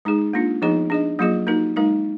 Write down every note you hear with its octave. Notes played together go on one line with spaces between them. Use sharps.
G#3 D#4 G#4
A#3 D4 F4
F3 B3 D#4 G#4 D#5
D4 G#4 D#5
F#3 A#3 F4 G#4 D#5
A#3 D#4 F#4 A#4
G#3 D#4 A#4 F5